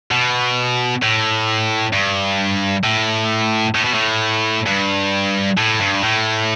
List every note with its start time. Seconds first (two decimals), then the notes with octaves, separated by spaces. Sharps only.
0.11 B2
1.02 A2
1.93 G2
2.84 A2
3.75 A2
3.85 B2
3.94 A2
4.67 G2
5.58 A2
5.80 G2
6.03 A2